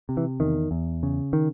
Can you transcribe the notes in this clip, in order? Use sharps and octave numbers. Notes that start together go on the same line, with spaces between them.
C3
E3
E2 D#3
E2
C#3
D#3